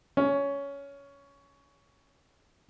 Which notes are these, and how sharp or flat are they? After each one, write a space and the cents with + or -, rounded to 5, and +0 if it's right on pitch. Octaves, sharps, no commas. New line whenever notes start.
C#4 +15